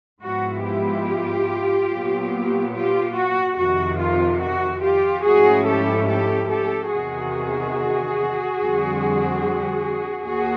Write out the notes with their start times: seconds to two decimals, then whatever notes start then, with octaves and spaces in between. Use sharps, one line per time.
0.22 G#2 F3 G#3 B3 E4 F#4
0.64 F4 G4
1.90 A#2 F#3 B3
2.73 F4 G4
3.15 F#4
3.56 F2 C3 D#3 F#4
3.99 F4
4.40 F#4
4.82 F4 G4
5.24 G#2 F3 A3 C#4 E4 F#4 G#4
5.66 G4 A4
6.07 G4 A4
6.49 G4 A4
6.91 E2 C3 D#3 F#4 G#4
8.59 F2 D3 G3 C4
10.25 D#2 F#4 G#4